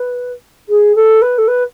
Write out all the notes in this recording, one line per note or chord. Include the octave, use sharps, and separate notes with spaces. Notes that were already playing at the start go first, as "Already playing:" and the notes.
Already playing: B4
G#4
A4
B4
A4
B4